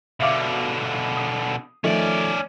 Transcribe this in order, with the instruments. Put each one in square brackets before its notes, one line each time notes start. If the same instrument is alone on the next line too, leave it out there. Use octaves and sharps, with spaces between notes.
[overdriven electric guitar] B2 D3 [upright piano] E5 F5 D6
[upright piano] D#6
[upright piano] D#3 F3 A3 [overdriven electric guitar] C#4 D5